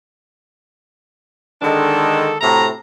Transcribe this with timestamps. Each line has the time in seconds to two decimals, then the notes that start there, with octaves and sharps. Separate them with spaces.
1.62 D3 D#3 G#3 D4 A4
2.41 A2 C3 F#4 A#5